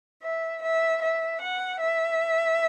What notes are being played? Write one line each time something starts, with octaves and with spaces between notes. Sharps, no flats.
E5
E5
E5
F#5
E5